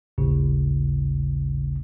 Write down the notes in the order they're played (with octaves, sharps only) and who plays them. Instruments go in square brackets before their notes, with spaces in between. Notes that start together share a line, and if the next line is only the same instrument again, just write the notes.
[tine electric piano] A1 D#2 A2 C#3